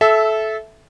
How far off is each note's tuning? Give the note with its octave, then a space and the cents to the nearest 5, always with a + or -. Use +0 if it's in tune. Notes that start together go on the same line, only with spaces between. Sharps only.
A4 -20 E5 +0